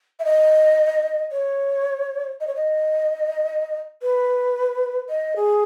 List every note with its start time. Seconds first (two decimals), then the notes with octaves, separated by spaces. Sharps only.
0.19 E5
0.25 D#5
1.32 C#5
2.40 D#5
2.47 C#5
2.56 D#5
4.02 B4
5.09 D#5
5.36 G#4